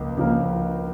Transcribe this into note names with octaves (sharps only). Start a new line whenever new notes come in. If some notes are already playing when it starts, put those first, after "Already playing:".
Already playing: C#2 C#3 F3 A#3
C#2 C#3 F3 A#3